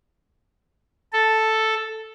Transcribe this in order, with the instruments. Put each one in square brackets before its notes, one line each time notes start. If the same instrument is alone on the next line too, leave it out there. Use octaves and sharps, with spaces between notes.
[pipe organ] A4